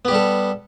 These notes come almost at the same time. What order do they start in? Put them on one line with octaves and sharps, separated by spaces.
B3 G4 G3 A4